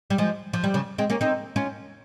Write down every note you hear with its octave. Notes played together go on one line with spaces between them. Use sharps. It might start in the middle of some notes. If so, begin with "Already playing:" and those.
G3
F3 G#3
F3
G3
C#3 F3
G#3 C4
A#3 C#4
C4 D#4
C#4 F4